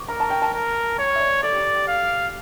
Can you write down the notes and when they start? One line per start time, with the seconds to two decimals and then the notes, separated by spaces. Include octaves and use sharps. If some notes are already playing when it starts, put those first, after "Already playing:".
Already playing: C#6 D6
0.09 A#4 A#5
0.20 A5
0.30 G5
0.42 A5
0.53 A#4
0.98 C#5 C#6
1.16 E5
1.20 D5
1.43 A4 D5
1.53 G4
1.73 G4
1.88 F5